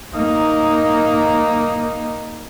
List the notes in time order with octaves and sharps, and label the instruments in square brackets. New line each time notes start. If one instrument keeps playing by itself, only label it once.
[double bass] A#3 D#4